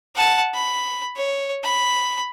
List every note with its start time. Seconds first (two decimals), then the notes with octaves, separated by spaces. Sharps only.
0.16 F#5 A5
0.54 B5
1.17 C#5
1.63 B5